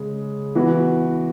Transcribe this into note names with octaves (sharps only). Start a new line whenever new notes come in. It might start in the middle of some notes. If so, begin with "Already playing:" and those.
Already playing: C#3 G#3 G#4
E3 B3 F#4 B4